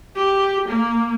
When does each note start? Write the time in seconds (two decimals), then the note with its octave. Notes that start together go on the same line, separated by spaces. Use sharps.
0.16 G4
0.69 A#3